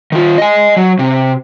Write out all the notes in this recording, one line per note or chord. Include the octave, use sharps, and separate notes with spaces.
D#3 F4
D#5 G#5
F#3
C3